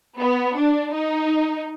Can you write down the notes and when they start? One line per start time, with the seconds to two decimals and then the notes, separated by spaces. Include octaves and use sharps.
0.17 B3
0.56 D4
0.92 D#4